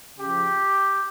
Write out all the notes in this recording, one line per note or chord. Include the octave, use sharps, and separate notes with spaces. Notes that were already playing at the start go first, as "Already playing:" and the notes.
C#3 F3 G4